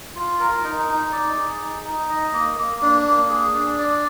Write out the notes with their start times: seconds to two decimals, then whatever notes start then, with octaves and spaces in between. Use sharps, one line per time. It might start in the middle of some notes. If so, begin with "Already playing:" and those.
0.15 F4
0.40 A#4
0.64 D#4
0.89 D#4
1.12 D5
1.36 G#4
1.61 D#4
1.84 D#4
2.09 D#5
2.33 A#3
2.57 A#3
2.82 D4
3.06 A#3
3.29 G#4
3.54 D4
3.78 D5